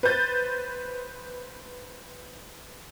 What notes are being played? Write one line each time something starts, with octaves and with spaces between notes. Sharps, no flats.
B4 C5 G6 A6